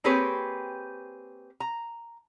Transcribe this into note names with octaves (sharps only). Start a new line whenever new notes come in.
A#3 C4 G4 G#4 B4 C#5
A#5